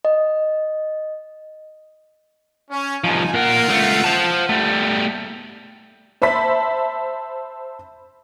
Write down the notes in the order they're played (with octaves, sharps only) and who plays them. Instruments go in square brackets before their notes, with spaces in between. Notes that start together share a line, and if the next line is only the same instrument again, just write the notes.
[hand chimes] D#5
[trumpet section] C#4
[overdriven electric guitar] C2 F3 [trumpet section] D#4 G#5
[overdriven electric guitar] A#2 A#4 [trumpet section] F4 F5 F#5
[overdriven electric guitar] C#2 A3
C5 A5
G3 A3
[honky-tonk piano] C5 E5 A5 B5 B6